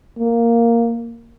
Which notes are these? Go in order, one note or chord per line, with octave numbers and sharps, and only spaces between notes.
A#3